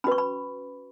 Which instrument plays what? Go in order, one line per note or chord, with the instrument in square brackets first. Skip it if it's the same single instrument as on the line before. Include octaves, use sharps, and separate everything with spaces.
[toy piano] C#4 B5
F#4 B4 C#6
B5